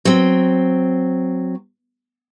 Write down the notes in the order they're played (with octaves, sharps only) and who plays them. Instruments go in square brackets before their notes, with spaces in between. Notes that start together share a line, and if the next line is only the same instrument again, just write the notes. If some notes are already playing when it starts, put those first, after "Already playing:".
[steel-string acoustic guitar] F#3 C4